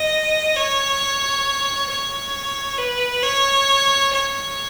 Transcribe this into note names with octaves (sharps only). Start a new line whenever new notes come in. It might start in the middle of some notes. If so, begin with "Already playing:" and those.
Already playing: D#5
C#5
C#5
B4
C#5
C#5